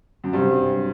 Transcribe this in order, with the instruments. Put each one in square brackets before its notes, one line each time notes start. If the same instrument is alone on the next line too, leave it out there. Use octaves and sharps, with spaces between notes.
[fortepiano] F#2
[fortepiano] G2 [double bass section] C3 F#3 C4